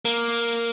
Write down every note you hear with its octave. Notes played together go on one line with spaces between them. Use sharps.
A#3